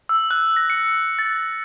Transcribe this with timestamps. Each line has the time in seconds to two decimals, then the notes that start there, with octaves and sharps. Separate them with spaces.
0.09 E6
0.31 F#6
0.57 A#6
0.70 C#7
1.19 A6